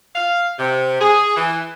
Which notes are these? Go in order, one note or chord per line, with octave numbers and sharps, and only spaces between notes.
F5
C3
G#4
E3